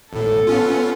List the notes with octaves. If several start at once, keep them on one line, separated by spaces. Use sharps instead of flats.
G#1 A2 A4
B3 C#4 F4